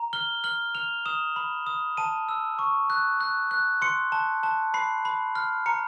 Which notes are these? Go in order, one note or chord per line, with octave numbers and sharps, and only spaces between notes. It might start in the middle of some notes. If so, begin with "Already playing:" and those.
Already playing: A#5
F6 G7
F6 F#7
F6 F7
D#6 E7
B5
D#6
A5 D#7
E6
C#6
F#6
F#6
F#6
C6 C#7
A5
A5
B5 C7
B5
F6
A#5 C#7